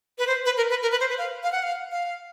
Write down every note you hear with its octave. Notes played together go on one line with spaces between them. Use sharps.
B4
C5
B4
A#4
B4
A#4
B4
C5
B4
F5
F5
F#5
F5
F5